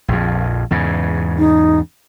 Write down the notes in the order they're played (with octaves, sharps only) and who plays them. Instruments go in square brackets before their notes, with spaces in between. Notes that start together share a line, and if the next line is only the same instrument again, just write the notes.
[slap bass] A#1 F2
E2 G#2 C#3
[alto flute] D#4